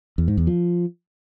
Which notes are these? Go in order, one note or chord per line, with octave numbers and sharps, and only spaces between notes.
E2
G#2
E2
F3